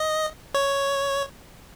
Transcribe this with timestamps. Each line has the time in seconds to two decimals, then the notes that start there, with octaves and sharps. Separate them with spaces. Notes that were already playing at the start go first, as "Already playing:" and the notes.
Already playing: D#5
0.54 C#5